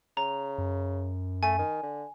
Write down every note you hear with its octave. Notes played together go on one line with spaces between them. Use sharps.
C#3 A#5
F#2
A3 G#5
D#3
D3